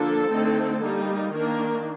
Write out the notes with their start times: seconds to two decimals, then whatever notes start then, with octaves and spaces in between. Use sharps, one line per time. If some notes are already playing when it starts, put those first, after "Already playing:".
Already playing: D3 F3 A#3 D4 A4
0.30 D3 A3 C4 D#4
0.82 G3 A#3 D#4
1.34 D#3 A#3 D4 A#4